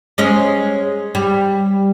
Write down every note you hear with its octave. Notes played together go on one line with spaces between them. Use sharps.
G#3 C#4 D#5
G3